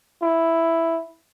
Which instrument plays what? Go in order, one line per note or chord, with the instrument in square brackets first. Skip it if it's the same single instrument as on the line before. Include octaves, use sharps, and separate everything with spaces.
[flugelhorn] E4